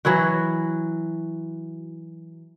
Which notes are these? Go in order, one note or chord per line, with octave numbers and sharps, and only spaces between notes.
E3 F#3 E4 F#4